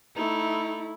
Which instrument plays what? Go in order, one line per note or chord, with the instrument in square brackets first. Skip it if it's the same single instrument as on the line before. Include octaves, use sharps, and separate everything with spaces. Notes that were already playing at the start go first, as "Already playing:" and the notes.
[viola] A3 E4 [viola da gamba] D#4